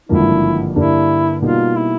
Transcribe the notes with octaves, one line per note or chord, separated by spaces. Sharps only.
G#1 G2 D3 F3 A#3 E4
G2 D3 G3 A#3 D4 E4
B2 G3 A#3 D#4 F4
E4